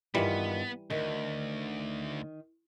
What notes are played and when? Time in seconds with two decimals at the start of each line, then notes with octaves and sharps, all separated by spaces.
0.15 G2 D#3 E3 G3 B3 F4
0.90 D2 D#3